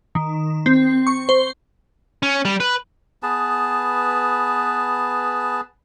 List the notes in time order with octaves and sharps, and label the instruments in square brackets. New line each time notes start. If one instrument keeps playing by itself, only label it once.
[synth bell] D#3
C4
C#6
C5
[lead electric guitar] C#4
G3
B4
[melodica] B3 G#4 B4 A5